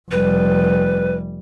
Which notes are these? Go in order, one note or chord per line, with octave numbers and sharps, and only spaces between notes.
F1 G3 B4